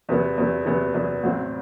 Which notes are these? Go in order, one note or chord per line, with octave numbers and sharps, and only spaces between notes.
E2 C3 F#3 B3
E2 C3 F#3 B3
E2 C3 F#3 B3
E2 C3 F#3 B3
A1 A2 F#3 C4